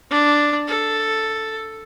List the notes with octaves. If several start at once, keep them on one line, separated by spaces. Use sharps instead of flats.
D4
A4